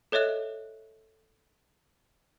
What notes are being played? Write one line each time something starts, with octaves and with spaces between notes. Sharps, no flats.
A4 C#5 D#5 E5 F#6